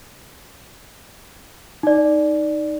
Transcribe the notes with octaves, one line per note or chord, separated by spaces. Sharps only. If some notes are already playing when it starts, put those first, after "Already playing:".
D#4 D5